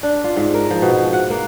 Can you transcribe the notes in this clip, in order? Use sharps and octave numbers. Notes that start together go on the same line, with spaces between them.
D4
F4
G#2
A#4
F3
B2
F3
F#5
A#3